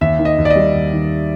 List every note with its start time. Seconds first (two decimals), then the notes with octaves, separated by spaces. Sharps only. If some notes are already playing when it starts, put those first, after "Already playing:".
0.01 D#2 E5
0.19 D#3
0.25 D#5
0.38 D#2
0.45 D5
0.50 D#5
0.56 G3
0.74 D#2
0.93 D#3